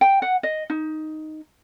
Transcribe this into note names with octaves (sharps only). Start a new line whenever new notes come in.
G5
F#5
D#5
D#4